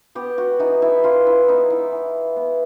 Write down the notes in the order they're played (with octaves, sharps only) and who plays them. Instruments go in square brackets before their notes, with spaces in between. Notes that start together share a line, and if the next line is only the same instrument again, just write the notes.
[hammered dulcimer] B3 G4
F#4
E3 D#4
E4
E3 F4
E4
B3 D#4
E4
E3
B3